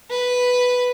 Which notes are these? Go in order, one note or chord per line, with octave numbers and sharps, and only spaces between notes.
B4